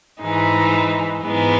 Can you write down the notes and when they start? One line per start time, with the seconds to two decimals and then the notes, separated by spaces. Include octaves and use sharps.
0.22 G#2 E3 G#3 D#4
1.23 G#2 E3 G#3 B3 D#4